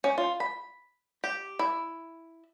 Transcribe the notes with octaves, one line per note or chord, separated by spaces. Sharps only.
C#4
F4
B5
G4
E4